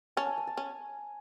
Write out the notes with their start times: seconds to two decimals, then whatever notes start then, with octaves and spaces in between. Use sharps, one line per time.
0.17 C#4 A5
0.27 G#5
0.38 G#5
0.47 A5
0.57 C#4 G#5